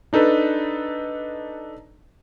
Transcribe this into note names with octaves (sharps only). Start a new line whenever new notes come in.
D4 D#4 A4 B4